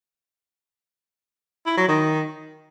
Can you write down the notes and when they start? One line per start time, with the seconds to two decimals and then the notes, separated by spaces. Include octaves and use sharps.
1.66 E4
1.77 F#3
1.88 D#3